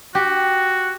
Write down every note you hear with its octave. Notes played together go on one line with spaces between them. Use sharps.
F#4 G4